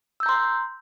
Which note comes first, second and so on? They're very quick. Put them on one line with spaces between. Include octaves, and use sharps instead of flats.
E6 G6 A#5 C6